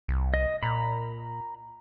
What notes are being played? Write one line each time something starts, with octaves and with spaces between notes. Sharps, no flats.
C2
D#5
A#2 A#5 B5